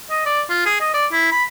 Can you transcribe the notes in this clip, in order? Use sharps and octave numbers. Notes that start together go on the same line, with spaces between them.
D#5
D5
F4
G#4
D#5
D5
E4
B5